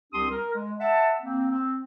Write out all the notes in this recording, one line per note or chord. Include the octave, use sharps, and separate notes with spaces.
C2 C4 D4 G4 C6 D#6
A#4
G#3
E5 F#5 A5
A#3 C4
C4